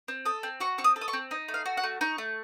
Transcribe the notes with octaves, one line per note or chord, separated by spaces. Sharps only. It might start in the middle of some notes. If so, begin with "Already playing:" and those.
C4
A4 D#6
C4
F#4 C#6
C4 C#6
D#6
A4
D#6
C#6
C4
D#4
A3
F5
F#4
F#5
A3
D#4 C#6
A3